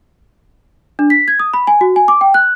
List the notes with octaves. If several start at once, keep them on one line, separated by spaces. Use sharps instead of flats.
D4
B6
G#6
D#6
B5
G#5
F#4
G#5
D6
G5
F#6